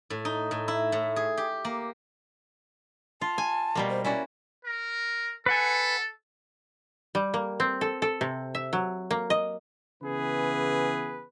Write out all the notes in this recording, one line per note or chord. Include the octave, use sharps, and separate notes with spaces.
A2
D#4
A2
E4
A2
G#4
G4
A#3
F4 A5
G#5
B2 G3 A#3
C5
C#4 E4 F#4 D5
A#4
A4 B4 F#5 G#5
G3
A#3
C4
A4
A4
C3
E5
F#3
A#3
D#5
C#3 E3 B3 G#4 B4